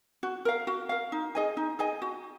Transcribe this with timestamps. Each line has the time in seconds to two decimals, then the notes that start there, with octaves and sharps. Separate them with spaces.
0.23 F#4
0.45 A#4 F5
0.67 F#4
0.89 A#4 F5
1.12 D#4
1.35 G#4 D#5 G#5
1.57 D#4
1.79 G#4 D#5 G#5
2.02 F#4